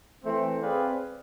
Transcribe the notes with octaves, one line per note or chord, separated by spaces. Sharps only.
E3 A3 C4
C4 G#4 B4 D5 F5